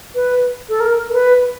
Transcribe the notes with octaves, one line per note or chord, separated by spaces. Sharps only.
B4
A4
A#4
A#4
B4